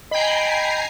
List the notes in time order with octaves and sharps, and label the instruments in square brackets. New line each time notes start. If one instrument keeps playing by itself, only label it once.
[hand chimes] D#5 [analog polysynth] G5 B5 [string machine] G#5 A#5 C7